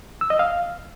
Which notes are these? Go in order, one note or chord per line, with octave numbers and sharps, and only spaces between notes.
E6
D#5
F5